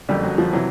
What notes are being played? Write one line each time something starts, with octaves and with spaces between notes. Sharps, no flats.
F#1 F2 D3 G3
F#3
F3
C3 E3 F#3